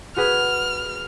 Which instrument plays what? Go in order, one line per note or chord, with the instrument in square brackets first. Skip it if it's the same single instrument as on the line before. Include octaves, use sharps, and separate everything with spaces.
[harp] F#4 G#4 B4 [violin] F6